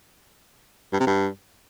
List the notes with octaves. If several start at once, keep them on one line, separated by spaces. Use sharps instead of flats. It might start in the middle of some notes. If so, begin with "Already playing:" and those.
G2
C3
G2